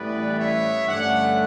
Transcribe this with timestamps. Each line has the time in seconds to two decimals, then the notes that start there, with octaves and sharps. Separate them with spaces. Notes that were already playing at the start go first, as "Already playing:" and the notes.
Already playing: A1 A2 E3 G3 B3 B4 D5
0.38 C#5 E5
0.87 G2 D3 A3 C#4 D5 F#5